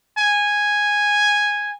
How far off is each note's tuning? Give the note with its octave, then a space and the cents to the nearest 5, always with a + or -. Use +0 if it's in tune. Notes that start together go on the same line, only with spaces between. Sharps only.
G#5 -5